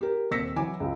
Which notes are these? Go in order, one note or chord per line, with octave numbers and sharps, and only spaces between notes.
G4 A#4
D#1 C3 E6 A#6 B6 C#7
E3 F#3 G#5 D6
C#2